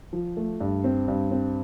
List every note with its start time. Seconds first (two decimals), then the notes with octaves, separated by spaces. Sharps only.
0.13 F3
0.37 A3
0.60 G2
0.84 C4
1.08 G2
1.31 C4